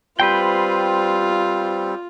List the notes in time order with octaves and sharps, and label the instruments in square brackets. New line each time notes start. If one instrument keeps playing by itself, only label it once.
[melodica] G3 C4 [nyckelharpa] F4 [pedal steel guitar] B4 C5 G5